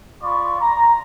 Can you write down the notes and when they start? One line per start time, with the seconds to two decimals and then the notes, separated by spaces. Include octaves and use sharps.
0.23 F4 D5 B5 C#6
0.61 A#5